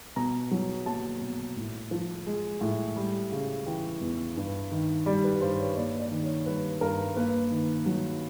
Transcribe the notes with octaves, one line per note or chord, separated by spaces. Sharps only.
B2 A#5
F#3
A#3 A5
B2
A2
F3
G#3
A2
G3
C#3
E3 G5
E2
G2
D#3
G3 D5
B4
G2 C5
C#5
A#3 D5
D5
D#3
C#5
G3 B4
G2 A#4
A#3 B4
D#3
F#3